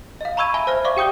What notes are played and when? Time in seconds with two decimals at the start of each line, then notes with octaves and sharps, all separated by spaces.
0.21 D#5 F5
0.37 A#5 B5 C#6 E6 G#6 D#7
0.54 E5 G#5 A5 B5 D#7 G7
0.67 C5 E5 F6
0.85 D5 E5 F5 C#6 D6
0.97 G4 G5 D#6 G6 G7